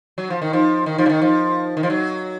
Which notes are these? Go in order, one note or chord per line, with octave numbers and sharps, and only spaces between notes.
F#3
F3
D#3
F3
D#3
F3
C#3
D#3
F3
D#3
F3
F#3